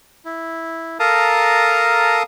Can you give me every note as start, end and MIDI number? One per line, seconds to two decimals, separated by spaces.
0.25 0.98 64
1.00 2.23 69
1.00 2.23 70
1.00 2.23 77
1.00 2.23 81
1.00 2.23 82
1.00 2.23 87